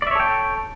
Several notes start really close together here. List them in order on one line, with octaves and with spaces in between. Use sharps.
D5 E5 C#5 A4 G5